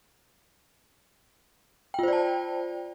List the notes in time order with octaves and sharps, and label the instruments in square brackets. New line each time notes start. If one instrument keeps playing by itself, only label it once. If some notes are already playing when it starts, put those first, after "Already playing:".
[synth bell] G5
F4
C5
D5
A5